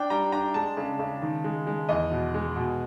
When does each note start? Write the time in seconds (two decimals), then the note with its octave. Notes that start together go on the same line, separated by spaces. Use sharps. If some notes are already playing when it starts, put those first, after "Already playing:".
Already playing: D4 G5
0.10 G3 A#5
0.32 D4 A#5
0.54 G#3 A5
0.77 C#3
0.99 C#3
1.22 D#3
1.44 G#3
1.67 G#3
1.89 E2 D#5
2.11 B2
2.34 G#3
2.56 B2